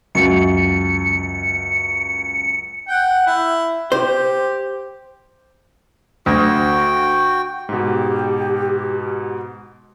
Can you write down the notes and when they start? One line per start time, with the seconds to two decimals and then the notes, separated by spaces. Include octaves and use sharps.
0.15 C#2 F#2 C#7
2.88 F#5 G5
3.26 E4
3.92 G4 C5
6.26 D2 F#4 G5
7.69 G#2 B2 G4